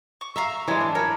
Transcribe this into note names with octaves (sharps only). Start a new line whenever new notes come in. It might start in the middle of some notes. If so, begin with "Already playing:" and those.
C#6
E5 F5 A#5 C#6
E3 G#3 C#5 D5
D4
A#4 B4 C#5